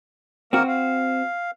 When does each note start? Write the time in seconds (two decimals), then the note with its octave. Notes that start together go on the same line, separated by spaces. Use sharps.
0.53 D#3 A#3 C4 F#4 A#4
0.68 F5